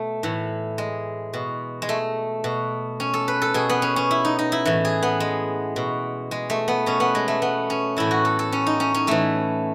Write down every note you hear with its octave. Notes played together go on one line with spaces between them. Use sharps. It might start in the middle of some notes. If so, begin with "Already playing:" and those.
Already playing: B2 A3
A2 E3
G#3
B2
G#3
A3
B2
C#4
A4
B4
A4
B2 G#4
B3
C#4
C#4
E4
D#4
D#4
E4
A2 E3
G#4
B3
G#3
B2
G#3
A3
B3
B2 C#4
B3
G#3
A3
B3
C#4
A2 E3 E4
F#4
A4
A4
C#4
D#4
C#4
C#4
A2 E3 A3